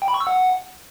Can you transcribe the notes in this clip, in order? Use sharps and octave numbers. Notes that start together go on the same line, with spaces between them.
G5
B5
C#6
E6
F#5